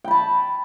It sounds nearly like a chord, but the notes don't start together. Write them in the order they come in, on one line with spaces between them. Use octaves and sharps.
G5 B5 A5